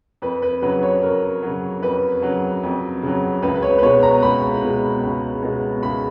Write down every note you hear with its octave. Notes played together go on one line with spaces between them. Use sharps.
F2 B4
B4
C#3 F#3 B4
C#5
F2 A#4
C#3 F#3
F2 B4
C#3 F#3
F2
C#3 F#3
C#2 B4
B4
C#5
B4
B2 G#3 C#5
A#5
C#2 B5
B2 G#3
C#2
B2 G#3
C#2 B5